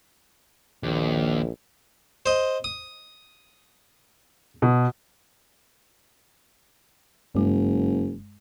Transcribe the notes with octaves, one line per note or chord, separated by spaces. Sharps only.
A#1 D#2
C5 D#5
D#6
B2
F#1 G2 G#3